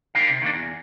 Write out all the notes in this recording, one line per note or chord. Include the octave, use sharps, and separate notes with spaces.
G3 D#4 A#4 F5
C3
D#3 A#3 D4
E2